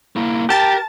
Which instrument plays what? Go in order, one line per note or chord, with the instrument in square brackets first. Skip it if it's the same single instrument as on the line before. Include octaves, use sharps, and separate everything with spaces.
[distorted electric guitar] A#3 E4
[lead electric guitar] G4 [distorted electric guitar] A#4 A#5 [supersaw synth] A5 A6